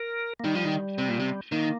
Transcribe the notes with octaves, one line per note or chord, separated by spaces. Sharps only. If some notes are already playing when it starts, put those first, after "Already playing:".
Already playing: A#4
A#3
D#3 G3
F3
D#3
C3
A#2
C3
D#3 A#3